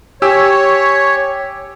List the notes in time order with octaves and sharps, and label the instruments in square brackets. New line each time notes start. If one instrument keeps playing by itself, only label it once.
[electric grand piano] G4 G#5 E6 [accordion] C#5